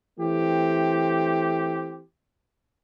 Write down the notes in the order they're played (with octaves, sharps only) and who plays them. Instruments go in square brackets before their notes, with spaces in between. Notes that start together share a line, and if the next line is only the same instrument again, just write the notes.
[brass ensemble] E3 A3 C4 G4